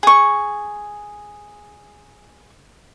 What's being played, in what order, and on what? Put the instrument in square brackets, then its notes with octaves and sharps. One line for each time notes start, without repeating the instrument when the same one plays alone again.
[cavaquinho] G#4 C#6